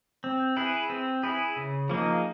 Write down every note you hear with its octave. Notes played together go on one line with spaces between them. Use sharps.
C4
E4 G#4 B4
C4
E4 G#4 B4
C#3
F3 A#3 D#4 G#4